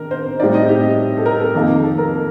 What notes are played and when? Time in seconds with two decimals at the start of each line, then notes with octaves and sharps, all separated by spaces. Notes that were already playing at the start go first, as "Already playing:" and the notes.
Already playing: D#3 D4 A#4
0.11 C5
0.40 A2 G3 C4 D#4 D5
0.54 D#5
0.69 G4
1.18 A4
1.26 A#4
1.40 A4
1.55 F2 D#3 A#3
1.83 A4
1.98 A#4